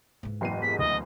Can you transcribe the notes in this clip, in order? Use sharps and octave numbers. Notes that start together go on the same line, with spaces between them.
G#2 E3
F#1 E2 B2 G5 C7 D#7
A#3 G4 G#4 B6
D2 D#5